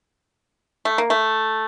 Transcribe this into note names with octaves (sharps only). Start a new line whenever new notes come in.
A3
A#3
A3